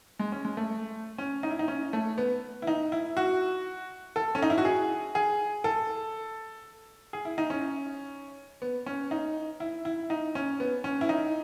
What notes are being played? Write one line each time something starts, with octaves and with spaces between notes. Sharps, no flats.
G#3
C#4
G#3
A3
C#4
D#4
E4
D#4
C#4
A3
B3
E4
D#4
E4
F#4
A4
C#4
D#4
E4
F#4
G#4
G#4
A4
G#4
E4
D#4
C#4
B3
C#4
D#4
E4
E4
D#4
C#4
B3
C#4
E4
D#4